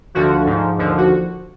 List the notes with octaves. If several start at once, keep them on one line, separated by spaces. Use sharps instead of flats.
D2 D3 F3 F#4
G#2 F3
D#2 D3 F3
F#4